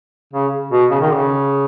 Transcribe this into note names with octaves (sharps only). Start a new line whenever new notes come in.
C#3
B2
C#3
D#3
C#3